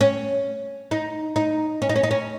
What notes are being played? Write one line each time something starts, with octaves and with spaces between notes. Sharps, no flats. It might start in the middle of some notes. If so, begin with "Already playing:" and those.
C#4
D#4
D#4
C#4
D#4
C#4
D#4
C#4